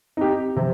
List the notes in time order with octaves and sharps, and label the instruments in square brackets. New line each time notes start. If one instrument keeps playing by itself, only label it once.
[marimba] C4 [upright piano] D#4 G4
[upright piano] C3 [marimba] F3